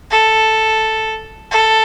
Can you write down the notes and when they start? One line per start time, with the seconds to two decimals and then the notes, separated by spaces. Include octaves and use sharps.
0.11 A4
1.52 A4